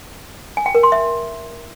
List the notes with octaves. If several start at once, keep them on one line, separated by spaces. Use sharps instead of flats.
G#5
G5
A#4
C6
E5